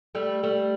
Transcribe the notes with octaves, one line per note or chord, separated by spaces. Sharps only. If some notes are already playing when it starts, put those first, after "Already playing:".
G3 A3
G3 A3